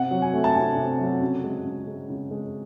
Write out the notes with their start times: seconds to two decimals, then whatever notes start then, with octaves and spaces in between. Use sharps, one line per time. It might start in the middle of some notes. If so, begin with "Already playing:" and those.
Already playing: C3 F#5
0.11 F#3
0.22 G#5
0.34 A3
0.44 A5
0.55 C3 G#5
0.77 C3
1.00 F#3
1.21 C#3
1.44 G#3
1.65 C#3
1.88 G#3
2.10 C#3
2.31 G#3